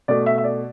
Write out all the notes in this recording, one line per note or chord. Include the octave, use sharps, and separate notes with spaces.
B2 A3 D5
E5
E5
D5